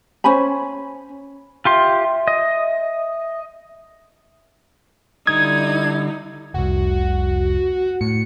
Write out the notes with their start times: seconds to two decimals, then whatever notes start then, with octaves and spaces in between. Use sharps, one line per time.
0.24 C#4 C5 G#5 B5
1.65 F4 G4 E5 C6
2.28 D#5
5.27 D3 G3 D#4 E4 D#6 G#6
6.54 F1 C2 F#4
8.01 A2 C#7